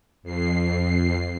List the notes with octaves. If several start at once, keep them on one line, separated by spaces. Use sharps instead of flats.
F2 C7